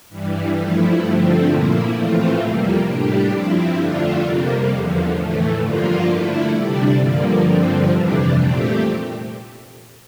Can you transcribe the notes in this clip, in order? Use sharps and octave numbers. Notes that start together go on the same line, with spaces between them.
G2 E3 G3
G2 F3 A3 E4
G2 D3 F3 A3 C4
A#2 F3 A#3 E4
A2 E3 A3 C4 F4
F2 C3 G3 A#3
A2 G3 D4 G4
G2 F3 C4 E4
F2 D3 A3 D4 F4
F2 C3 G3 A#3
E2 D3 F3
A2 E3 A3
G2 D3 F3 A#3 F4
D3 A3 E4
C3 G3 D4
G2 D3 F3 A#3
G2 D3 F3 C4
F2 C3 E3 G3 D4
A#2 A3 C4 G4